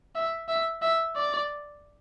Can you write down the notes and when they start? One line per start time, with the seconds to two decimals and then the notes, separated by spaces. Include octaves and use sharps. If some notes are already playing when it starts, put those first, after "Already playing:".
0.15 E5
0.48 E5
0.82 E5
1.16 D5